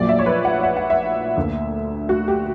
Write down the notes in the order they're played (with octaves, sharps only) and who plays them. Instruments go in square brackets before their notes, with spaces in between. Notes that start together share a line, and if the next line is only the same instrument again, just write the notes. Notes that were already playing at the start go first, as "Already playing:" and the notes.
Already playing: [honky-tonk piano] A#1 A#2 F#3 A#3 D5
E5
C#5
B4
F#5
E5
F#5
E5
D2 D3 A#3
F#4
G4